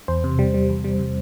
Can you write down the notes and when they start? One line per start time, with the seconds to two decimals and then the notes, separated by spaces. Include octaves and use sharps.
0.08 E2 C5
0.24 C3
0.39 G3
0.54 G3
0.69 E2
0.84 G3
0.99 C3